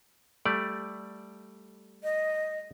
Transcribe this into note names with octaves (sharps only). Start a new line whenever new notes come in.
G3 A3 D5
D#5